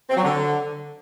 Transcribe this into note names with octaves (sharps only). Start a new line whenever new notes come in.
C4
F#3
D3